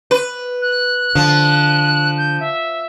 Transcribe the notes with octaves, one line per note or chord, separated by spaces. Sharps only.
B4
F#6
D3 F3
G6
E5